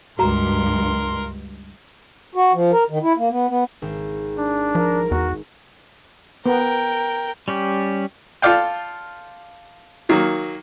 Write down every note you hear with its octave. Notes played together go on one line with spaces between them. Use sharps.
C#2 G2 F#4 A#4 A#5 C6
F#4
F3
A#4
D#3
E4
A#3
B3
B3
G#1
D4
F3 A#4
E2 F#4
B3 A#4 G5
G3 C#4 G4
F4 A4 D5 F5 G5
D#3 F#3 A#3